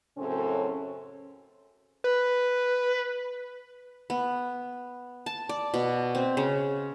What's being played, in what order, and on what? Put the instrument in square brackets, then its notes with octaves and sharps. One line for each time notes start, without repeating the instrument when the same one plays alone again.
[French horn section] F#2 A2 C#3 C4 C#4 A4
[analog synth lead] B4
[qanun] B3
A5
D5
B2
C4
C#3